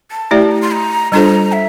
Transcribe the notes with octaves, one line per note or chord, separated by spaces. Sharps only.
A5
A3 E4 G4 D5 G5
A5
A#5
C6
A#5
G3 D4 F4 A4 C5 A#5
E5